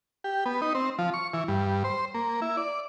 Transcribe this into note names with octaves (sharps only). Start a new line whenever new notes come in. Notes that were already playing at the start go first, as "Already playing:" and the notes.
G4
B3
D#4
C4
F3
C#6
E3
G2
C5
A#3
E4
D5